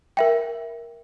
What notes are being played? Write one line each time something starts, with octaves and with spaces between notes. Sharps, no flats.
A#4 E5 G5